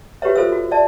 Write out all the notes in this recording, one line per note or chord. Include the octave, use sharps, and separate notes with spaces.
F#4 G4 B4 C#5 E5
F4 A4 C5 E5 F5 E6
F#4
D5 E5 A5